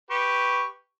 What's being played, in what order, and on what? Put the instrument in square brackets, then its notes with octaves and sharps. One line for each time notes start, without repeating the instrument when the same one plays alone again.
[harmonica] G4 B4 C#6